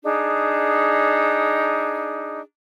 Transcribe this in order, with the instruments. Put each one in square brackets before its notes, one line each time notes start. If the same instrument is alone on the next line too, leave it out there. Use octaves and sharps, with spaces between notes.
[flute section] D4 D#4 G#4